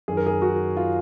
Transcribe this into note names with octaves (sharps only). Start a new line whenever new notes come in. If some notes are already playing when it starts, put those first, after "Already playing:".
F#2 D#3 G#4
A#4
G#4
F#4
F4